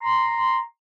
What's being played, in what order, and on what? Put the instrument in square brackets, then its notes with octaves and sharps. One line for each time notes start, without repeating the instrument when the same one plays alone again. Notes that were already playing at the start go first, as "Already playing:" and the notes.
[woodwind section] A#5 C6